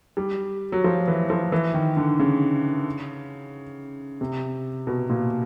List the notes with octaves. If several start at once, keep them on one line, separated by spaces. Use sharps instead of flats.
G3
F#3
F3
E3
F3
E3
D#3
D3
C#3
C3
B2
A#2